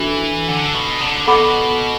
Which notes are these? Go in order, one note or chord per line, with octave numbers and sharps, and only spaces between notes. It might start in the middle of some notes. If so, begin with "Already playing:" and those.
Already playing: E3 D4 F#4 A4
D3
B2
D3
B2 A4 F#5 B5 D6